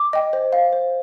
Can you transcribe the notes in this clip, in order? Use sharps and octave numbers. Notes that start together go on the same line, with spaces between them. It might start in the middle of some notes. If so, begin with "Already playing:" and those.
Already playing: D6
D#5 G5
C5
F5
C5